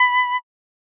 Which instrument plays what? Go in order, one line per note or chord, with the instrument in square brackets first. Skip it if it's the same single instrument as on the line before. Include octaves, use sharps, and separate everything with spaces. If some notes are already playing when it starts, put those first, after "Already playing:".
Already playing: [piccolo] B5